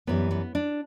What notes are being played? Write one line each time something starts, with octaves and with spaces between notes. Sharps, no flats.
F#2 E3 G3 B3
B3
D4